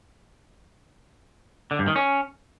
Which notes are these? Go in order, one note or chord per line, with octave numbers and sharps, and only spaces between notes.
D3
G2
D#3
C#4